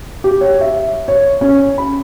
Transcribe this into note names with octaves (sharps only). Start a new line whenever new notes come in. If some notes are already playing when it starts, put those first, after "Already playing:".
G4
C#5
E5
C#5
C#4
B5